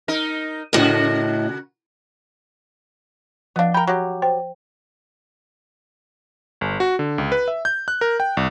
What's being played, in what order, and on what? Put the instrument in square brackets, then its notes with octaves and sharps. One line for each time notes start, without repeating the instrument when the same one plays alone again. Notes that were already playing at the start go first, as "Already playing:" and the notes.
[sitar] D#4 A#4
[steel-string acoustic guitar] A2 D#5 [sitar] C#3 F#4 A#4
[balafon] F3 F5 [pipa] B3 D4
[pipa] A#4 G5 [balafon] B5
[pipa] F#3 G4
[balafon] C5 G5
[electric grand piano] G1
F#4
D3
C#2
B4
E5
G6
F#6
A#4
G5
C2